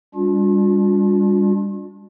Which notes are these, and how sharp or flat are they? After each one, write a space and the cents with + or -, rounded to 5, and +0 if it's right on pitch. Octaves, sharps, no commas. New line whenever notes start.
G3 +35 D4 -25 F4 +45